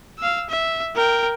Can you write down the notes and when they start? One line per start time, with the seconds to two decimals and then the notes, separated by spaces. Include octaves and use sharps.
0.19 F5 E6
0.50 E5
0.96 A#4 G5